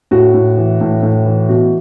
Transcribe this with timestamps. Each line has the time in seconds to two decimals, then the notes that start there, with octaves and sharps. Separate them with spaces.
0.11 A2 F#4
0.34 A2
0.57 E3
0.81 A2
1.03 A2
1.26 E3
1.49 B2 F#4